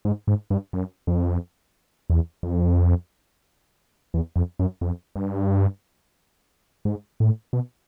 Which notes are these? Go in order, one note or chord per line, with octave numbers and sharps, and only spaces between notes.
G#2
G#2
G2
F#2
F2
E2
F2
E2
F2
F#2
F2
G2
G#2
A2
B2